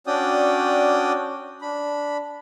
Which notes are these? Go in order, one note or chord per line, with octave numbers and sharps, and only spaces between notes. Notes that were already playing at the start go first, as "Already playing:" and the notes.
C#4 D4 F#4 D5 G5 D#6
D4 B5